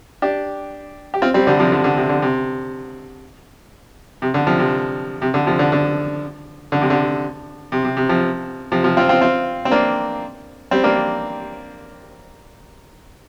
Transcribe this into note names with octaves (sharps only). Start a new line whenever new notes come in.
D4 G4
G4
C4 F4
G3 C4
D3 G3
C3 F3
D3
D3
C3
D3
C3
C3
D3
C3 F3
C3
C3
D3
C3 F3
D3
D3
D3
C3
D3
C3
C3
C3
C3 F3
C3 F3
C3 F3
C4 F4
C4 F4
C4 F4
C4
A#3 D4
G3 C4
A#3 D4